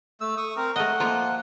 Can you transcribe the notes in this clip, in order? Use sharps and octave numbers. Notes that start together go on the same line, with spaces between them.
A3 E6
C#6 D#6
C4 A#4
A3 D#5 F#5
F3 A#3 F4